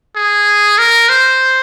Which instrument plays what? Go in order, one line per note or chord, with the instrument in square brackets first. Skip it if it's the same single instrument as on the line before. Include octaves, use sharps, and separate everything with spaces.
[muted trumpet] G#4
A#4
C5